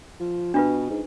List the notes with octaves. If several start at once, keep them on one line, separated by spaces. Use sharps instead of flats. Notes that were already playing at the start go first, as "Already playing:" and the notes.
F3
B2 D4 F4 B4
G#2